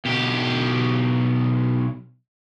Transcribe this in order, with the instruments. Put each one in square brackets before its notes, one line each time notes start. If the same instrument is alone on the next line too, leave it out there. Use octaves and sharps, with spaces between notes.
[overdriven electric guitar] B1 G4